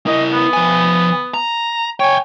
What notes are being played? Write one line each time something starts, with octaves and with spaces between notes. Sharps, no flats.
E4 A#4 D#5
B3
F3 G#5
A#5
C#5 G5 G#5